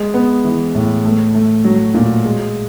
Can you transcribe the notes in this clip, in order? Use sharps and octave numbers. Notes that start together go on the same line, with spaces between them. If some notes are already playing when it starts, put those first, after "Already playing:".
Already playing: G#3
B3
E3
A2
A3
A3
F#3
A#2
G#3